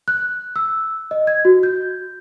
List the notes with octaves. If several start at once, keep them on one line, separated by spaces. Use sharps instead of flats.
F#6
E6
D#5
G#6
F#4
G6